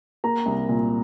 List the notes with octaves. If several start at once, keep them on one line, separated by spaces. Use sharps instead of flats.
A#3 A#5
C2
A#2